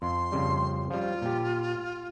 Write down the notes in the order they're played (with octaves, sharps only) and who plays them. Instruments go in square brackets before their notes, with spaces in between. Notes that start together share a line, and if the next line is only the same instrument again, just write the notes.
[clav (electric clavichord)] F2 [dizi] C6
[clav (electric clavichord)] F2 C#3 G3
[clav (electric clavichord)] F3 G3 [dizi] F4
[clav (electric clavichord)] A#2 G4